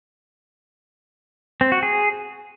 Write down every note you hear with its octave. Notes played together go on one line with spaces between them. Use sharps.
C4
F#4
G#4